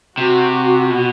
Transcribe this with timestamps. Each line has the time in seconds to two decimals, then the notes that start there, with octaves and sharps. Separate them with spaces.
0.18 C3 F#4
0.90 B2